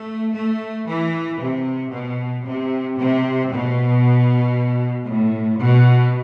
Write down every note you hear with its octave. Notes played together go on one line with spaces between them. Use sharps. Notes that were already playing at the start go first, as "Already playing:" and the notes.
Already playing: A3
A3
E3
C3
B2
C3
C3
B2
A2
B2